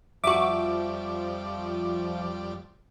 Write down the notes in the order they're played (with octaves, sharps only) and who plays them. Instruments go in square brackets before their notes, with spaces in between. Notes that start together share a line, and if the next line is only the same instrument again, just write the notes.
[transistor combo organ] F2 G3 D5 [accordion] F3 [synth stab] F#4 D6 [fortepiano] E5 C#6